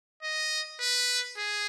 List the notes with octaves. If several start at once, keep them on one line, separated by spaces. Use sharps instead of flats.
D#5
B4
G#4